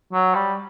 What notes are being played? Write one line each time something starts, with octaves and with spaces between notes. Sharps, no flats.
F#3
G3